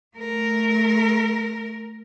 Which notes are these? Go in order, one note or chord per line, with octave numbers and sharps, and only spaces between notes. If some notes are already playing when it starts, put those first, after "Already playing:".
A3 A#4